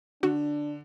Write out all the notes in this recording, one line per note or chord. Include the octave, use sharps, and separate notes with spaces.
D3 D4 F#4